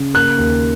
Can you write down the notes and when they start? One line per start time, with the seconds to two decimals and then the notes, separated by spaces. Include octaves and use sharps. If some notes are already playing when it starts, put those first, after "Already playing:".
Already playing: C#3
0.14 A#3 F#6
0.38 D#2